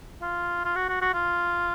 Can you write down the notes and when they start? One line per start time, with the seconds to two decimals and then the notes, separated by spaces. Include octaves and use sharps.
0.22 F4
0.65 F4
0.76 F#4
0.89 F#4
1.02 F#4
1.14 F4